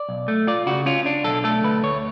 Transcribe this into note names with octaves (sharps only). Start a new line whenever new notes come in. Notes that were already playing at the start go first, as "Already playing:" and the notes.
Already playing: D5
B1
A3
F4 D5
C#3 F#4
C#4 F4
D4
B1 A4
A3 A4
D2 B4
D2 C#5